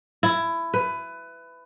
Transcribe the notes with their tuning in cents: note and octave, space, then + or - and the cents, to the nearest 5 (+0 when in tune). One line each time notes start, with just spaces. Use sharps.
E4 +15
B4 +20